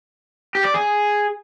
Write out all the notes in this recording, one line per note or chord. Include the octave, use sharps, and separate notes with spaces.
G4
D5
G#4